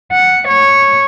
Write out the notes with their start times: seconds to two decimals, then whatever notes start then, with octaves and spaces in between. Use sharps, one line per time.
0.12 F#5
0.48 C#5